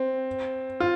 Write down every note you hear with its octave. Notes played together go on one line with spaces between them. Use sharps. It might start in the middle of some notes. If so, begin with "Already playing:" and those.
Already playing: C4
F4